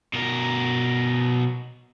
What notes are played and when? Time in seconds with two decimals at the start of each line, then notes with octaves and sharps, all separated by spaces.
0.13 B2 A#4